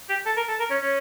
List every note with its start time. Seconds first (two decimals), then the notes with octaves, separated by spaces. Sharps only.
0.09 G4
0.26 A4
0.37 A#4
0.48 A4
0.59 A#4
0.70 C#4
0.81 C#4